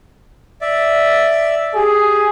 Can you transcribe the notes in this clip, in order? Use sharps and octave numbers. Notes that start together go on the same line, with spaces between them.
D5 E5
G4 G#4